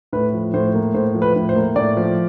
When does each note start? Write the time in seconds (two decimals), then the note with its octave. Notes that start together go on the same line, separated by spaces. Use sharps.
0.13 A2 B4
0.33 F3
0.53 A2 C5
0.74 A#3
0.94 A2 C5
1.14 F3
1.22 B4
1.36 A2
1.49 C5
1.56 A#3
1.76 A2 D5
1.97 F3